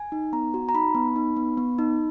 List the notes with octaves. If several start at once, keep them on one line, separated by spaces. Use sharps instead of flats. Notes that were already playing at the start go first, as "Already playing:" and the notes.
Already playing: G#5
D#4
B3 A#5
F#4
A#5
D#4 B5
B3
D#4
B3
B3
D#4